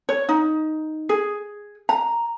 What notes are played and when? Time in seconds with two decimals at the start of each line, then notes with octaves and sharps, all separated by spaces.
0.09 C#5
0.29 D#4
1.09 G#4
1.89 A#5